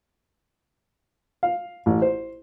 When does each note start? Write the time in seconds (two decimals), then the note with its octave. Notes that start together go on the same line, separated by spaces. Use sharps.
1.43 F5
1.86 A1
2.02 C5